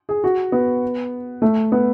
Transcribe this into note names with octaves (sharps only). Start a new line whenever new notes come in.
G#4
F#4
B3
A3
B3